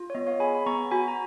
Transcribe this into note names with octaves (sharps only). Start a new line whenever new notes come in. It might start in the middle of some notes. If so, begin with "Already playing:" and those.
Already playing: F4
C#5
B3 D#5
C#5 F5
G#4 G#5 B5
B5
B3 A#5 C#6
F#4 G#5 B5
A#5